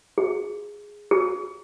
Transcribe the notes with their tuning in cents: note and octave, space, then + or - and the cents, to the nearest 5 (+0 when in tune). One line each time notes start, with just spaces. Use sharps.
G#4 -5
G#4 -20